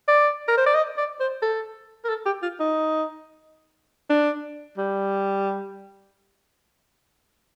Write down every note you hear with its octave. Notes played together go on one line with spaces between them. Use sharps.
D5
A#4
C5
D5
D#5
D5
C5
A4
A#4
A4
G4
F4
D#4
D4
G3